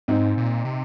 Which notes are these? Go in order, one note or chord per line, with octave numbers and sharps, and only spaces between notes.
G#2 C4 D#4
A#2
C3